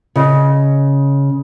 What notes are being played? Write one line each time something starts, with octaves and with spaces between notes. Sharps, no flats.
C#3 D#5